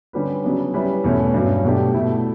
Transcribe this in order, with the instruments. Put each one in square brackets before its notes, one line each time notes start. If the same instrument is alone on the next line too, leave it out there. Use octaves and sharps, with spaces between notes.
[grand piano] D3 G3 C#4 G4 B4
C#3 F#3 B3 D4
G3 C#4 E4 B4 D5
E2 B2 A3 C#4
G2 F#3 C#4
B2 A3 D4 G4
B2 A3 E4